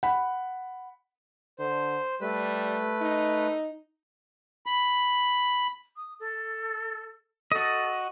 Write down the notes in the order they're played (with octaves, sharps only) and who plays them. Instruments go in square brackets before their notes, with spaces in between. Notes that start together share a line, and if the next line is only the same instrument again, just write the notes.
[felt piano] F#5 B5
[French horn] D3 [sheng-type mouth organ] C5
[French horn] G3 [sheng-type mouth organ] A3 B4
[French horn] D#4
[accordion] B5
[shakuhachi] D#6
A4
[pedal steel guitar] F#4 D#5 [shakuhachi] A4